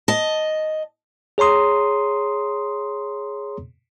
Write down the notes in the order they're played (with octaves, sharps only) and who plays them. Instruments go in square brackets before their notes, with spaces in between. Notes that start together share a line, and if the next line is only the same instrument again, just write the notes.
[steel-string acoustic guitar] D#5 A5
[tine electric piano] G#4 C#5 A#5 C6 D#6